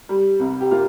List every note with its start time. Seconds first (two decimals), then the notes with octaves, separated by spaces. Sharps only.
0.09 G3
0.40 C2
0.61 G4
0.71 A#3 F4